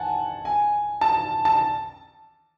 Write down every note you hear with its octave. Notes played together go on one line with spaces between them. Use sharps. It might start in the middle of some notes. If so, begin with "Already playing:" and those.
Already playing: F#5 G#5 A5
G#5
A5
A5